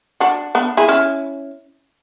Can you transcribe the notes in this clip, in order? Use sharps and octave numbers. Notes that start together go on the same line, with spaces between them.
D4 F#4
B3 D4
E4 G#4
C#4 E4